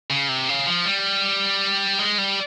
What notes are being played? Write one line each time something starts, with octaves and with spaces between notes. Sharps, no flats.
C#3
C3
C#3
F3
G3
G#3
G3